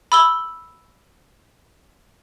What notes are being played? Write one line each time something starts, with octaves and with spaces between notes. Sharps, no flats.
B5 E6 G7